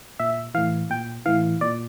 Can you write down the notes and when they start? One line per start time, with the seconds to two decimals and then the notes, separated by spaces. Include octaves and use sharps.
0.20 A#2 E5
0.54 A2 E3 F5
0.90 A#2 G5
1.26 A2 E3 F5
1.61 A#2 D5